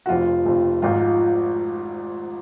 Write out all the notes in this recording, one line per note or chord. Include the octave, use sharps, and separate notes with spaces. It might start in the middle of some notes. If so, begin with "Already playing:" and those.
F#4
F1 F2 F3 F4
F1 F2 F3
G#1 G#2 F3 F4